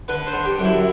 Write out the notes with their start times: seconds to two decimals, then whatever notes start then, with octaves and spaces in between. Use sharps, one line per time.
0.08 D3 B4
0.27 C5
0.33 D3
0.45 G4
0.58 F#2
0.64 E4